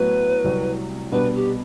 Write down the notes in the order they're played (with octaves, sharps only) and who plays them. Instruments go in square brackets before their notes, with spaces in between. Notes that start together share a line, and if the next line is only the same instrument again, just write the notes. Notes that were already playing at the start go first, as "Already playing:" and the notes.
Already playing: [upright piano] A2 F#3 B3 E4 [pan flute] B4
[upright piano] C2 C3 F#3
[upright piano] B2 G3 B3 D4 [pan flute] B4
[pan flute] G4